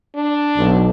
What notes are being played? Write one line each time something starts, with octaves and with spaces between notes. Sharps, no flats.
D4
B1